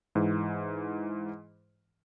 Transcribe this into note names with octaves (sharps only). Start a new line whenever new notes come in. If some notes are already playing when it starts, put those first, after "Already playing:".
G#2 E3